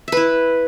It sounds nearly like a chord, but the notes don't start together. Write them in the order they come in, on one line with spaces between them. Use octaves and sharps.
E5 B4 E4